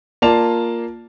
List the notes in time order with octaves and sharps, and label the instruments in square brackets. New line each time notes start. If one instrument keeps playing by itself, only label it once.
[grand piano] A#3 F4 D5 A5 F7